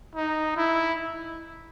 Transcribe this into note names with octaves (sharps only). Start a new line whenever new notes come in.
D#4
E4